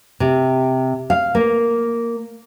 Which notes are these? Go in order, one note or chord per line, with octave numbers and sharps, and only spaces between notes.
C3
F5
A#3